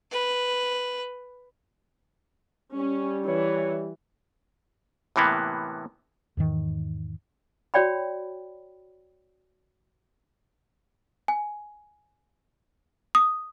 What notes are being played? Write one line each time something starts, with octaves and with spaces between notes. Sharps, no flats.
B4
G3 C#4
E3 C#5
A2 C3 E3 A#3 B3
E2 G#2 D#3 E3
F#4 C#5 D5 G5 B5
G#5
D#6